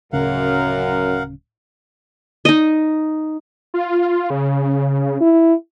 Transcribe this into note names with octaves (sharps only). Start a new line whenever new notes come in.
D1 F#2 C#3 A#4 F5 F#5
D#4 D#5
F4
C#3
E4